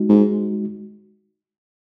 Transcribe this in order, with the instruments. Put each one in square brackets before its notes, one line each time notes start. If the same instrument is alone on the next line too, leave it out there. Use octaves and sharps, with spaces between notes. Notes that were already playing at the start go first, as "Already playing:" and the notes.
Already playing: [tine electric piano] G#3 D#4 F#4
[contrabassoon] G#2